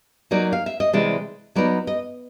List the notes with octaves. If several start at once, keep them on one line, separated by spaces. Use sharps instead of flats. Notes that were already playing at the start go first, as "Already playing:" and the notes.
F#3 A#3 D#4 D5
F5
E5
D#5
C3 E3 G#3 D5
F#3 B3 D#4 D5
D#5